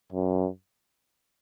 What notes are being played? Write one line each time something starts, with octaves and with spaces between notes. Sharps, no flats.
F#2